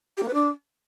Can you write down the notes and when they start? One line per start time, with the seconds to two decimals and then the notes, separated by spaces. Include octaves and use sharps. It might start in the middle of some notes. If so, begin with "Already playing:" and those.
0.17 G4
0.22 A#3
0.28 B4
0.33 D4